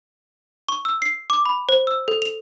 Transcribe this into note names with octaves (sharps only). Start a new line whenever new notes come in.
C#6
E6
C7
D6
B5
C5
E6
A4
F7